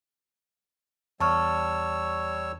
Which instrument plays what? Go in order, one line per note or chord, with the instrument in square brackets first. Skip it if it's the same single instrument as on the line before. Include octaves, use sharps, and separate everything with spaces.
[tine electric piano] E2 [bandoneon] G3 C#5 E6 [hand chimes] A5 C#6 F6